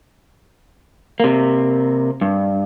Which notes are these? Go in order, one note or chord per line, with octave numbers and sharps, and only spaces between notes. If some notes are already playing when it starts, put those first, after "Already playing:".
C3 A#3
G2